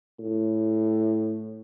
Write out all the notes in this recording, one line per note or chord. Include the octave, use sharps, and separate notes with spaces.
A2